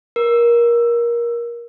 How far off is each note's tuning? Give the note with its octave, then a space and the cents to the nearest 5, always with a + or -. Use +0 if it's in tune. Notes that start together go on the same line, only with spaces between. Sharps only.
A#4 +20